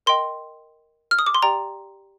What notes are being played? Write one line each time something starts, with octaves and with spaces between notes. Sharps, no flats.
A#4 D#5 G5 C6
F6
D#6
D6
C6
G4 D5 G5 A#5